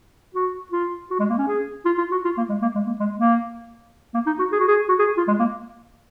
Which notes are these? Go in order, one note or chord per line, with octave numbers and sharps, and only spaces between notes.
F#4
F4
F#4
G#3
A#3
C#4
G#4
F4
F4
F#4
F4
A#3
G#3
A#3
G#3
A#3
G#3
A#3
A#3
D#4
F#4
G#4
F#4
G#4
F#4
G#4
F4
G#3
A#3